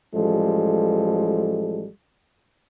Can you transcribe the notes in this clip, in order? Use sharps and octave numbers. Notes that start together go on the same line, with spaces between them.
A1 F3 G3 G#3 A4